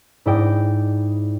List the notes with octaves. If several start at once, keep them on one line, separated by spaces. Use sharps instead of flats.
G#2 E4 D5 D#5 G5